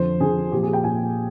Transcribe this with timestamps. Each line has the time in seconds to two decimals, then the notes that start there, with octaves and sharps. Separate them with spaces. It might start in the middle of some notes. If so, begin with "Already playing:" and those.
Already playing: F2 D3 F3 C5
0.20 F2 D3 F3 G#4
0.52 A#2 F3 G4
0.63 G#4
0.73 G5
0.84 A#2 F3 G#5